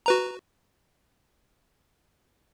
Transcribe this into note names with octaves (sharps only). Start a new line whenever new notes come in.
F#4 B4 A#5